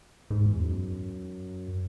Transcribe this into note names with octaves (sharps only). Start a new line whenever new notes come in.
G#2
E2
F#2